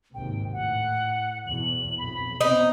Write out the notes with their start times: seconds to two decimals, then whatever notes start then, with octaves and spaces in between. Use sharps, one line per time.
0.14 G#1 D#2 C3 G5
0.53 A2 F#5
1.47 E2 B2 F#7
1.98 B1 F2 B5
2.41 B3 C4 D#4